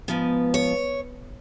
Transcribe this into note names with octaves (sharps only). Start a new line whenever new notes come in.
G#2 F3 B3
C#5